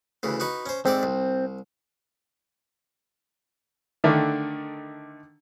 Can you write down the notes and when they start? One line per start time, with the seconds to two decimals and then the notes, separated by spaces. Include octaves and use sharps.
0.23 D2 C#3 E3
0.40 D#4 F#4 B4
0.66 C#4 C5
0.86 G#2 C4 A4 D5
1.03 C2
4.04 D3 D#3 A3 D4